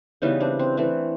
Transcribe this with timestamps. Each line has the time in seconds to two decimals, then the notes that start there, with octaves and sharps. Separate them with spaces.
0.22 C#3 E3 G3 B3 C#4 D#4
0.40 C4 D4
0.59 C4
0.77 E3 A3 C4